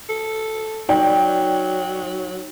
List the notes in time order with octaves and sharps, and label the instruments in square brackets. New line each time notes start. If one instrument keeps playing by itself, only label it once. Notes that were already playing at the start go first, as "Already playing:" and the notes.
[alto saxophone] A4
[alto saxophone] F#3 [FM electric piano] D#4 [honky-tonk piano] D5 G5